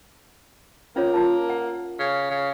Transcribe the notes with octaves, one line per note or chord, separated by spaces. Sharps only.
A#3 C#4 F4 C#5
F4 A#4 A5
F#5
C#3
C#3